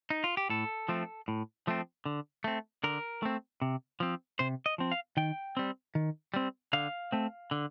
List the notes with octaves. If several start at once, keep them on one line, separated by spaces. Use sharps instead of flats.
D#4
F4
G4
A2 A4
F3 A3 C4
A2
F3 A3 C4
D3
A3 C4
D3 A#4
A3 C4
C3
F3 C4
C3 C5
D#5
F3 C4
F5
D#3 G5
G3 C4
D#3
G3 C4
D3 F5
A3 C4
D3